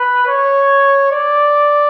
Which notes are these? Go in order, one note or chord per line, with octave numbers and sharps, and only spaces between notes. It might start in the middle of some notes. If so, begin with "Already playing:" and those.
Already playing: B4
C#5
D5